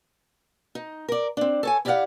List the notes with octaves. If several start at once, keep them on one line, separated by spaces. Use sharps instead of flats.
D#4
A#4 D5
C4 D4
A4 C#5 G#5
E4 G4 D5 D#5 F5 F#5